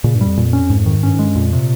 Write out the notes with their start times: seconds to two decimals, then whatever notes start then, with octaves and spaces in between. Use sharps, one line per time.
0.04 A#2 C#3
0.15 G2
0.21 G3
0.26 F2
0.37 A#2
0.53 C#4
0.70 G#2
0.86 D#3
1.03 G2 C#4
1.14 G#2 G#3
1.25 G2
1.35 F2 A#2
1.53 C3